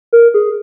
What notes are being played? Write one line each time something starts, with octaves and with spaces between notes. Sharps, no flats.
A#4
G#4